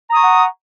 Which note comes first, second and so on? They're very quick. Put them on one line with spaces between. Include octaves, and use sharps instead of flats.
A#5 D#6 C#6 F#5